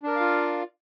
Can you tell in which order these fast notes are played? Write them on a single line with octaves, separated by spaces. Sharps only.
D4 A#4 D5 F5 F4